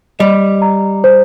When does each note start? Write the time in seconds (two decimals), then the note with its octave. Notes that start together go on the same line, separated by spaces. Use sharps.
0.20 G3 D#5
0.62 A#5
1.04 C5